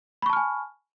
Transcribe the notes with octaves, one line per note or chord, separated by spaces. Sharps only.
G#5 A5 B5 C#6 F6